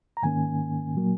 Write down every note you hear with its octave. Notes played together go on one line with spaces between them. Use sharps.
A#5
G#2 D#3 A#3 C#4 G#5
A#2 F#3 A#3